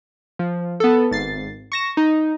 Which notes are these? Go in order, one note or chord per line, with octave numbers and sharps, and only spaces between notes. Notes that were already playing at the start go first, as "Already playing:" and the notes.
F3
B3 A4
G#1 A6 C7
C#6 A#6 E7
D#4